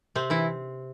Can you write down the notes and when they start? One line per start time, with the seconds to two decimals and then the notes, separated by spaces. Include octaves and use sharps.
0.15 C3 C4
0.30 E3 E4